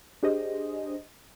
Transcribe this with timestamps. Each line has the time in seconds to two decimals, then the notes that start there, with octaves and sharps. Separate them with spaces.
0.23 D4 G4 G#4 C5 D#5